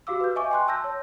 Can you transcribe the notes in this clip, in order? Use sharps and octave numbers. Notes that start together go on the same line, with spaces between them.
F#4 G4 F5 D6 E6
B4 G6
D#5 E5 G#5 C#6 D6
G5 C6 F#6
A5 E6 G6 A#6
C#5